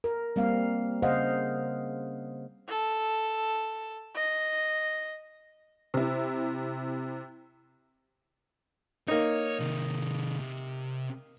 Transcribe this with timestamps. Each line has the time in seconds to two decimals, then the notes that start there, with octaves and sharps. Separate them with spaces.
0.04 A#4
0.36 G3 A#3 C4 F5
1.02 C#3 C5 D#5 F5 F#5
2.68 A4
4.15 D#5
5.94 C3 E4
9.08 A#3 D#4 C#5
9.60 C3 D#3
10.40 C3